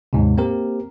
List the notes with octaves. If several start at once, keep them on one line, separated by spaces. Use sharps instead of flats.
D#2 G#2 C3
A#3 C4 G4 A#4